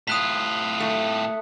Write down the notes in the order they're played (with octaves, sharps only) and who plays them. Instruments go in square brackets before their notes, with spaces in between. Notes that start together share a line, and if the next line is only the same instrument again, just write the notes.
[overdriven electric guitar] A2 F4 [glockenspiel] D#6 F#6 B6
[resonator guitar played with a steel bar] A3